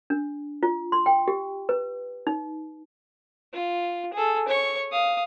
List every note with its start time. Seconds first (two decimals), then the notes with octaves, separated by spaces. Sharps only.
0.10 D4
0.63 F4
0.92 C6
1.06 G5
1.28 G4
1.69 B4
2.27 D#4
3.54 F4
4.13 G#4 A4
4.48 C#5 C#6
4.92 F5 D#6